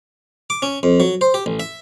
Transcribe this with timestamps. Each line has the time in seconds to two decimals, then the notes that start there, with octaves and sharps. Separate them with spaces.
0.50 D6
0.62 C#4
0.83 F2
1.00 F#3
1.21 C5
1.34 G4
1.46 A1
1.60 E5